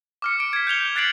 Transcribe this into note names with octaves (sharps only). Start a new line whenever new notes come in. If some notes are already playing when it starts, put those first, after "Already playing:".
D6 F6 C#7
D7
G#6 B6
G6 C#7 F7 G7
F#6 A6 B6 C7 D7 F#7